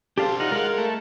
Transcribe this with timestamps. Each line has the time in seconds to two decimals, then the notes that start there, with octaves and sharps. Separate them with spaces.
0.18 D4 G4 A4 C5 F5
0.40 D#4 F4 F#5
0.52 G#3 G#4 A#4 F5
0.78 A3